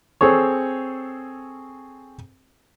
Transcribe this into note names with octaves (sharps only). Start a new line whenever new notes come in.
C4 G#4 A4 C#5